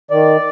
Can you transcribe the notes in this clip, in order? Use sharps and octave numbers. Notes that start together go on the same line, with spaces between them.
D#3 D5